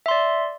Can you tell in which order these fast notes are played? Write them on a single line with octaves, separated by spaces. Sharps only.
E5 C6 D5